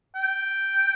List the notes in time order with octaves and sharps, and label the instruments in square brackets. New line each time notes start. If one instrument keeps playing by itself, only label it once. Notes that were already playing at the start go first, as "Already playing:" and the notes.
[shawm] G5